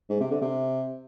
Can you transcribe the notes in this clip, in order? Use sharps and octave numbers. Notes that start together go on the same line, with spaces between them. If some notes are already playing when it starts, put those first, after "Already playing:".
G#2
C3
D3
C3